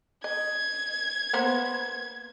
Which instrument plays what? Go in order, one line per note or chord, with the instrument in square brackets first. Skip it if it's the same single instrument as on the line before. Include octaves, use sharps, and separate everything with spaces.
[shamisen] D#5 [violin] G#6
[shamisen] A#3 B3 C5